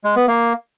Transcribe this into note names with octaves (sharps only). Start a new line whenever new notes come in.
G#3
B3
A#3